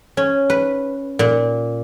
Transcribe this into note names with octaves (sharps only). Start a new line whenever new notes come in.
C#4
B4
A#2